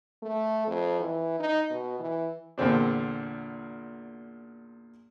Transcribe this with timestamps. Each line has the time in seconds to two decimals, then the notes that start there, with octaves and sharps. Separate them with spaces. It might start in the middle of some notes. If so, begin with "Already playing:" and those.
0.23 A3
0.68 F2
1.00 E3
1.40 D#4
1.70 B2
2.00 E3
2.58 E2 A#2 D3 C4 D4